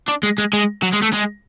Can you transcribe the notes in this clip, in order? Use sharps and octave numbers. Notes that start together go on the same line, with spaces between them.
D4
G#3
G#3
G#3
F#3
G#3
A3
G#3